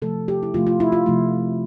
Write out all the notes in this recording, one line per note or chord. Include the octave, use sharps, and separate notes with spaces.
C3 F3 A3 A4
G4
E4
C3 F3 A3 F4
F4
E4
F4
C3 F3 A3